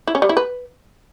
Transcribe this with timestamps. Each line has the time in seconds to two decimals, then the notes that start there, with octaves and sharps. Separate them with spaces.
0.07 E4
0.15 C#4
0.22 G3
0.29 E4
0.37 B4